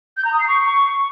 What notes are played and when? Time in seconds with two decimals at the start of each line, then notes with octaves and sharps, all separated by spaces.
0.17 G6
0.25 A#5
0.32 D#6
0.40 C7
0.48 C#6